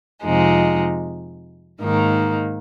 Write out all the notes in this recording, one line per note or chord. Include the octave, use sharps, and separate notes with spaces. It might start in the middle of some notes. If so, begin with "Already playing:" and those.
F2 C3 F3 G#3 D#4
G#2 D#3 A#3 D#4